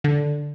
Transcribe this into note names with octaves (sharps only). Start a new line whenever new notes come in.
D3